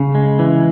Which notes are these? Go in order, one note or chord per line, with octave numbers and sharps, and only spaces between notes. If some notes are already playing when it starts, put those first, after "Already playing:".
Already playing: C#3
G#3
E3